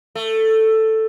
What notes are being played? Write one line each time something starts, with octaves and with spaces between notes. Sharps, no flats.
A3